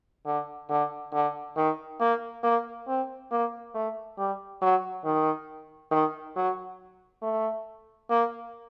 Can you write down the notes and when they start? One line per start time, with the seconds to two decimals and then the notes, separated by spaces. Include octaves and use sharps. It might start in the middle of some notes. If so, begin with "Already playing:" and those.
0.26 D3
0.70 D3
1.13 D3
1.57 D#3
2.00 A#3
2.44 A#3
2.88 C4
3.31 A#3
3.75 A3
4.18 G3
4.62 F#3
5.05 D#3
5.91 D#3
6.36 F#3
7.22 A3
8.10 A#3